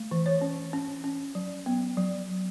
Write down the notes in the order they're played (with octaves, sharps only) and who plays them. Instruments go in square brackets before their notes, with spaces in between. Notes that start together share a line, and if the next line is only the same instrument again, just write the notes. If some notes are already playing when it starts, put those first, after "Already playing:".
Already playing: [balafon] A3
E3
C#5
C#4
C#4
C#4
F#3
B3
F#3